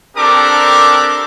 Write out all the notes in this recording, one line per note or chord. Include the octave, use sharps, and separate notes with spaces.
C4 D4 G4 A4 A#4 D6